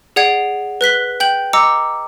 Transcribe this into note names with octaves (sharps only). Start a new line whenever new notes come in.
G#4 D5 F#5 G#6 C7 D7
B4 F#6 B6 G7
G5 G6 F#7
D#5 A#5 D6 E6 C#7